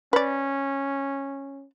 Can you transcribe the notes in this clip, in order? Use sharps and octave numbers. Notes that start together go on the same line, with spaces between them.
C#4 B4 D5